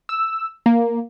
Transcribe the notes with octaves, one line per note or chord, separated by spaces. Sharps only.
E6
A#3